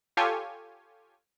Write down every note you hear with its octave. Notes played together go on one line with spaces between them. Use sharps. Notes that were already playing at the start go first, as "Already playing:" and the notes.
F4 G4 A4 C#5 G#5